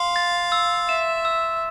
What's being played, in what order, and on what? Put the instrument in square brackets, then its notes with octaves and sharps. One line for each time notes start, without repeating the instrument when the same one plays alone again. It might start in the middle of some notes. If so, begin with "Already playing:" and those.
Already playing: [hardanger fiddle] F5 [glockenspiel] C6
[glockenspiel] A6
E6
[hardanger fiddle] E5 [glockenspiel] E7
[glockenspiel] E6